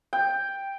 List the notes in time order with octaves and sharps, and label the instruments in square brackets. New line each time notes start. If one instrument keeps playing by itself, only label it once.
[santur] G5